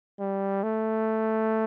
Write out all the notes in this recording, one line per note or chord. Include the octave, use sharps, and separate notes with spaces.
G3
A3